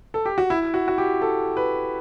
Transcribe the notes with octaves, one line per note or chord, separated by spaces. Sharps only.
A4
G4
F#4
E4
F#4
F#4
G4
A4
B4